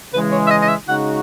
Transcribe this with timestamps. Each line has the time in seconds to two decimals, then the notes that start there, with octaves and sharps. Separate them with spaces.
0.13 C#3 E3 G#3 B4
0.32 C#5
0.47 E5
0.51 D#5
0.62 D#5
0.69 E5
0.88 C#3 G#3 D#4 F#4 F#5